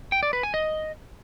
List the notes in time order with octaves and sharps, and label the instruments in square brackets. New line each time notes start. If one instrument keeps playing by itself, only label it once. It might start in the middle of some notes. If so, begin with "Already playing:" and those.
[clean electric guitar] G5
D5
B4
G#5
D#5